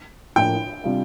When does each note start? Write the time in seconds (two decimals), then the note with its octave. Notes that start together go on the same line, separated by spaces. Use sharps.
0.36 A2 F3 A#3 D4 F4 G5
0.84 C3 G3 D4 F4